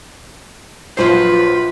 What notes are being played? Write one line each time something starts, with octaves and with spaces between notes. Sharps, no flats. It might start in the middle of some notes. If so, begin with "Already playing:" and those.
A#1 F3 F#3 F4 B4 C5 C7